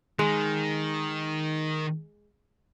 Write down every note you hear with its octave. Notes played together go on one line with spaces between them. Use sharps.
D#3 G#3